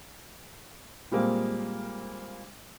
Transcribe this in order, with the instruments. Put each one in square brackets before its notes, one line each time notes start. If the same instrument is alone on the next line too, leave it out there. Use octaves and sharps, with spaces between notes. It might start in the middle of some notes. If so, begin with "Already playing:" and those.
[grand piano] A#2 G3 G#3 A#3 C4